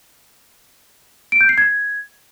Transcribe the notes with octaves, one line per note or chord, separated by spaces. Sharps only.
D7
G6
C7
G#6